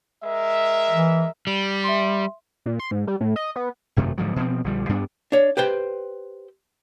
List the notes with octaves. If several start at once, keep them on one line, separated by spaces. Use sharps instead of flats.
G#3 A#4 E5
E3
G3
E5 C6
A#2
C6
G#2
G3
A2
D#5
B3
G#1 F#2 C3 A3
G#2 D3 F3 F#3
B2 F3 C4
A#1 D3 F3 G3
G2 G3 B3 D4
D4 C#5
G4 B4 C5 G5